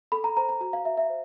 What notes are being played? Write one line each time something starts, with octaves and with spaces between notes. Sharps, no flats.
A4 B5
A#5
C5 A#5
A#5
F#4 A#5
F5
F#4 E5
E5
C5